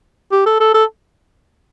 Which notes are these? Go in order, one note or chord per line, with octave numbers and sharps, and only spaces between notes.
G4
A4
A4
A4